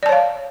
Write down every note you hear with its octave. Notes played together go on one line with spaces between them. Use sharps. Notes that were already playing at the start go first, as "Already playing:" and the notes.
C#5 D5 F5 A5